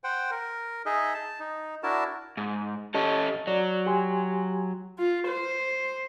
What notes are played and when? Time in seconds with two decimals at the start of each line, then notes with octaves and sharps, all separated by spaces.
0.04 C5 F#5 G5
0.31 A#4
0.86 D#4 G#4 D#5 E5
1.14 A5
1.40 D#4
1.83 D4 E4 F#4 A#4 A5
2.37 G#2
2.94 C#4 G4 A4 D#5 C#6
3.47 F#3 F#4 D5
3.86 G4 G#5 C6
4.99 F4
5.27 C5